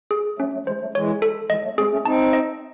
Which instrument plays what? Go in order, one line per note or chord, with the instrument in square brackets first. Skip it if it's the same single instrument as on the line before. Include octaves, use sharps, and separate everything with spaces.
[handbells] G#4
[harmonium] F#3 A3 [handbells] C#4
[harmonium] F#3 A3
[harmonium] E3 G#3 [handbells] C5
[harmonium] F#3 A3
[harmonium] E3 G#3 [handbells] C#5
[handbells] A4
[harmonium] E3 G#3 [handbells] D#5
[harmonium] F#3 A3
[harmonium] G#3 C4 [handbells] G#4
[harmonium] A3 C#4
[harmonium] C4 D#4 [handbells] A5
[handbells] D#5